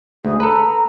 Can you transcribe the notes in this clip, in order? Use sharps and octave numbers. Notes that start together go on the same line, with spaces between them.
D2 G#4
A4 B4 A#5